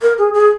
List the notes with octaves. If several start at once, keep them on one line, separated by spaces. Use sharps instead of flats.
A#4
G#4
G#4